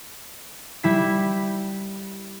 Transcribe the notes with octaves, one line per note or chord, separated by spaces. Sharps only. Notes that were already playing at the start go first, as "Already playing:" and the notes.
G3 E4 B6